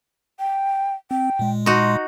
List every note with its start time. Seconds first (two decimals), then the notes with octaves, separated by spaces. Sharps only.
0.39 G5
1.11 C4 G5
1.39 A#2 G#3
1.66 D#4 F#4 C6